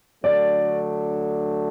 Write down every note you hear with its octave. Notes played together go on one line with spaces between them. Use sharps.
D3 F#3 A3 D4 D5